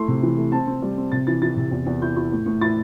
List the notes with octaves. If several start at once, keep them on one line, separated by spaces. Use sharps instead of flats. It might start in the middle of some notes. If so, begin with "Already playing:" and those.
Already playing: A3 E4 C6
C3
E3
A3
C4 A5
C4
G3
C4
C3 A6
E3 A6
E3 A6
C3
E2
E2
E4 G6
E4
A2
A2
E4 A6